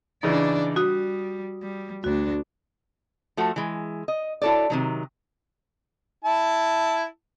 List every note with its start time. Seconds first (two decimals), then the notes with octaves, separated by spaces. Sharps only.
0.23 C#3 E3 D4 D#4 D5
0.76 G3 F#4 D#6
1.62 G3
2.04 D2 D4 F#4
3.37 F3 A3 F#4
3.56 E3 G#3
4.08 D#5
4.42 E4 F#4 A4 C#5 D5
4.70 C3 D#3 F#3
6.25 E4 A5